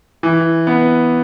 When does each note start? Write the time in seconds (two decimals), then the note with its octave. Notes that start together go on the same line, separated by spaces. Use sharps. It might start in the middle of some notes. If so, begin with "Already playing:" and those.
0.23 E3
0.67 B3